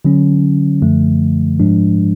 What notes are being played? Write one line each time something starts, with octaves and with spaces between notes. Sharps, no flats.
D3 F#3 C#4
F#2 D3 F3 A3
G#2 F3 G#3 D4